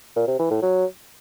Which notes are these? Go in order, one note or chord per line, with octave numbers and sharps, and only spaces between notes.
A#2
C3
E3
A2
F#3